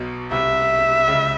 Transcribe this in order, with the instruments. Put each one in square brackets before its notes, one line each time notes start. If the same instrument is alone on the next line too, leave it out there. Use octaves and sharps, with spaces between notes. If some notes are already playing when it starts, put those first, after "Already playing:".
Already playing: [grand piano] B1 B2
[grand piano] C2 C3 [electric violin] E5
[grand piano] C#2 C#3